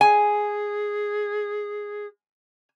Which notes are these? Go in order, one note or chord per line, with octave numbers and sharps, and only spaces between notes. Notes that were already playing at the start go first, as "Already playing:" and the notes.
G#4 G#5